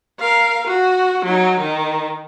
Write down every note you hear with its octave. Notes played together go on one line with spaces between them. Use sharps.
A#4 F5
F#4
F#3 D#4
D#3